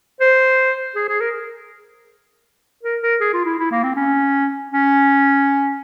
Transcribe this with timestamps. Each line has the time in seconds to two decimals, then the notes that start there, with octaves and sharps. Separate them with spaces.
0.21 C5
0.96 G#4
1.09 G#4
1.21 A#4
2.83 A#4
3.02 A#4
3.21 G#4
3.33 F4
3.45 E4
3.59 E4
3.72 A#3
3.84 C4
3.96 C#4
4.71 C#4